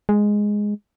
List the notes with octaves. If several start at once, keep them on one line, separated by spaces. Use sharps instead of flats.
G#3